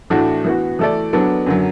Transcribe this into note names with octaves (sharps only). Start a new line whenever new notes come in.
A2 E3 A3 D4 F#4
E3 B3 F#4
E3 A3 E4 A4 D5
F#3 B3 D4 A4
F#2 D3 F#3